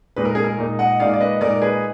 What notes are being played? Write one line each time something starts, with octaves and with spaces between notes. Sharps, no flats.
A#2 G#3 D#4 B4
A#4
G#4
A#4
A#2 G#3 D#4
D#5 F#5
A#2 G#3 D#4 D5 F5
D5
B4 D#5
A#2 G#3 D#4 A#4 D5
G#4 B4